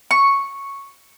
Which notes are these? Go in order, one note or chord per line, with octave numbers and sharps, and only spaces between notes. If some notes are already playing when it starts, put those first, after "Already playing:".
C#6